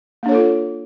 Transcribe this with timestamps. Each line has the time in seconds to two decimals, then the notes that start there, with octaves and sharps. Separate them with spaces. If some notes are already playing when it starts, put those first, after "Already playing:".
0.23 A#3
0.26 D4
0.29 C#5
0.32 A4
0.35 F4